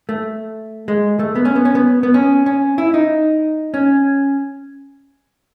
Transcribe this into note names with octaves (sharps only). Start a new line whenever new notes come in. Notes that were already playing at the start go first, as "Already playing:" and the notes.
A3
G#3
A3
B3
C#4
B3
C#4
B3
B3
C#4
C#4
E4
D#4
C#4